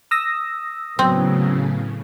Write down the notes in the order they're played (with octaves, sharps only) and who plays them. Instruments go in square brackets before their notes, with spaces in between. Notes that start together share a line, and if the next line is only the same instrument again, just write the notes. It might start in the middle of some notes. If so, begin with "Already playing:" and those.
[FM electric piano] D#6 E6 A#6
[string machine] A2 C#3 [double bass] F#3 B3 [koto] C4